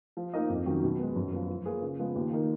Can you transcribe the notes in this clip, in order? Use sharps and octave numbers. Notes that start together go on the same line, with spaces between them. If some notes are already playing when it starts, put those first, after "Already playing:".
F3
A#3 D#4 A#4 D#5
F2
D#3 F#3 C#4
B2
G#3 B3
F#2
F3 B3
F3
A#3 F4 G#4 B4
C#3
F3 G#3 B3 F4
D#2
D#3 A#3 D#4 A#4